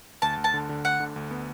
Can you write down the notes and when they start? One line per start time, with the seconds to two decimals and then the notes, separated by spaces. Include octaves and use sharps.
0.22 D2 A5
0.37 D2
0.44 A5
0.54 D3
0.69 D3
0.85 D2 F#5
1.00 D3
1.16 D2
1.31 B3